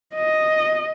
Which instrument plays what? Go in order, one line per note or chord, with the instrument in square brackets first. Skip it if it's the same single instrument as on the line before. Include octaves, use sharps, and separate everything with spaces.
[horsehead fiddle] D#5